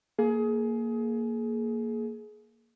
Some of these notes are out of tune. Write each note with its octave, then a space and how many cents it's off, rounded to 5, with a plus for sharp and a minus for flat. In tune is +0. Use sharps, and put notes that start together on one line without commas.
A#3 -5 G#4 +25